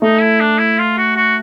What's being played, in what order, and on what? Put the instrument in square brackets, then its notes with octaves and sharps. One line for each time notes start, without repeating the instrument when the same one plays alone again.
[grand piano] A3 [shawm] D#4
[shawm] E4
D4
E4
F4
F#4
F#4